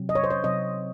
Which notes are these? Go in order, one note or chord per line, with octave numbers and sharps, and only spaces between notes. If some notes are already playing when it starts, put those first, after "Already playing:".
Already playing: C3 F#3 C4
D#5
C#5
C5
C#5
C3 F#3 C4 D#5